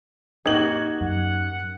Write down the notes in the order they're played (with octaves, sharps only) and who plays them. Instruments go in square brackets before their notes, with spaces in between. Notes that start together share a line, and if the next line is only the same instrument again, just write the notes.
[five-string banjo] A#3 D#4 G4 [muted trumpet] F#4 [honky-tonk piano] G#6 F#7
[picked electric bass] F#2 [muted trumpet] F#5